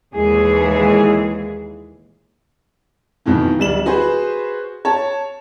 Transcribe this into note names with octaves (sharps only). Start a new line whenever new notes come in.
D#2 A#2 E3 G#3 G#4
F2 B2 D#3 E3
D1 G3 E7 F#7
F#4 G#4 B4 C5
C#5 A5